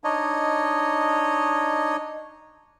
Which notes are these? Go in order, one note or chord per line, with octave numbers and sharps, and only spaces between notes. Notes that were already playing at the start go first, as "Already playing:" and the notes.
D4 D#4 C#5 D#5